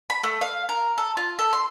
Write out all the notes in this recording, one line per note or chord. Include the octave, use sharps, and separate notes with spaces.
B5
A3
F5
A#4
A4
F4
A4
C6